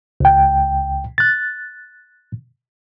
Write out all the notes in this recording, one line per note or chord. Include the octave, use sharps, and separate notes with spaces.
C#2 G5
F#6 A6